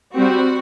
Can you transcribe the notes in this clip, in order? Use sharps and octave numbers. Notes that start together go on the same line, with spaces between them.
G3 C4 F#4